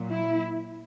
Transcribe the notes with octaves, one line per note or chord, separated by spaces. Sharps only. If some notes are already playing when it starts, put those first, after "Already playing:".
Already playing: A#2 F#3
E4